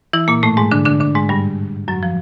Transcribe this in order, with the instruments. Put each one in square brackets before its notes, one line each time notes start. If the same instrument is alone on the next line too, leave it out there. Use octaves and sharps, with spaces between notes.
[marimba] E3 E4
A#2 A#3
A2 A3
G#2 G#3
D3 D4
D3 D4
D3 D4
G#2 G#3
G2 G3
F#2 F#3
F3